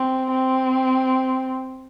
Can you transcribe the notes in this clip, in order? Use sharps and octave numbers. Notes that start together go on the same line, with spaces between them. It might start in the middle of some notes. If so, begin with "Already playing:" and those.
Already playing: C4
C4